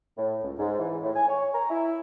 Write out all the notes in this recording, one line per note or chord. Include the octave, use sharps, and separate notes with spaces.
A2
C#2
G#2
E3
A2
G#5
C#5
A#5
E4